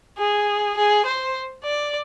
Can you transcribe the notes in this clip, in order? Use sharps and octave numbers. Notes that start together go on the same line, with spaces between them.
G#4
G#4
C5
D5